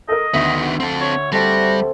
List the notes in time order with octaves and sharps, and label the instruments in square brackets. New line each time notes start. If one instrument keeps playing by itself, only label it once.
[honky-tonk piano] A4 A#4 [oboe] D#5
[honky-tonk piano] D2 E5 [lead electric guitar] D#3 B3
[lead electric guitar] C4 A4 [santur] C6 C#6
[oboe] C#5
[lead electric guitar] G3 [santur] A3 C4 A4 [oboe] F#4